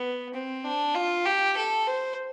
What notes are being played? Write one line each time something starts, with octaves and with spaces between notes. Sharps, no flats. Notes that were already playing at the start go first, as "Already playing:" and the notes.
Already playing: B3
C4
D4
F4
G4
A4
C5